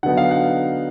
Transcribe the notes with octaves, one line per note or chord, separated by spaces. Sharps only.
D3 F#3 B3 D#4 F#5
F5
F#5